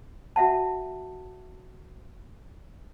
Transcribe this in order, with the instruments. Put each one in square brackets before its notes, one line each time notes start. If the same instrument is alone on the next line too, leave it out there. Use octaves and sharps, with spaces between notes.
[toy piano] F#4 E5 F#5 A5